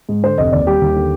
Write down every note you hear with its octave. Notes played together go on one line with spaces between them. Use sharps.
G#2
D3 C5
F1 D#5
D#2 D5
G3 G4
D#2
D3